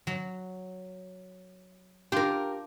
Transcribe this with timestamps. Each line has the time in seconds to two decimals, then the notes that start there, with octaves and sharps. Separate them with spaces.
0.07 F#3
2.12 D4 F4 G4 A#4